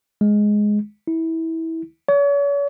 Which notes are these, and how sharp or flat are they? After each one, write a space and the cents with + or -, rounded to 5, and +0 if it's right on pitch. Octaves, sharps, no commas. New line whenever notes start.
G#3 +5
E4 -20
C#5 +40